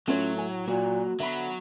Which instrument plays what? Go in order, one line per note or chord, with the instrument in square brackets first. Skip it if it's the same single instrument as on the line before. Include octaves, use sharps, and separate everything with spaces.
[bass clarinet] A2 [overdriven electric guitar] F#3 [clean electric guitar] A3 [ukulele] C#4 F4 C#5
[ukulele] G#5
[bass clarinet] A#2 [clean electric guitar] A#3 F#4
[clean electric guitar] D3 B5 [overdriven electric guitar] F#3 [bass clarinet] B3 [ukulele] E5